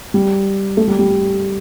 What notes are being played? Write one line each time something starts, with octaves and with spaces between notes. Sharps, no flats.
G3
A3
G3
G3